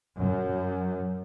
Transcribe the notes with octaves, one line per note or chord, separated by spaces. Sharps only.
F#2